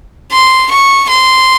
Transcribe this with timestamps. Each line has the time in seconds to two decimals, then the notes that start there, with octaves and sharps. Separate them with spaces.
0.32 C6
0.71 C#6
1.09 C6